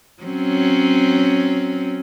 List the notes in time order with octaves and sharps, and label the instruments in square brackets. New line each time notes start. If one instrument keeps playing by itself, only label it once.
[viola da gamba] F#3 C4 C#4